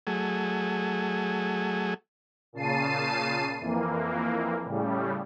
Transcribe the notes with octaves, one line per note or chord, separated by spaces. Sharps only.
F#3 A3 G#4
A#2 C#3 A5 C7 D#7
F2 E3 A#3
A2 C#3 G3